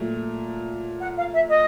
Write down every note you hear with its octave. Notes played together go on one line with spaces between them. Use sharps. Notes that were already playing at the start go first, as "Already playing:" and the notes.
Already playing: A#2 F#3 A3
F#5
F5
E5
D#5